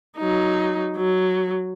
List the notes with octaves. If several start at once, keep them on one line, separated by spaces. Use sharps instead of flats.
F#3 D#4
F#3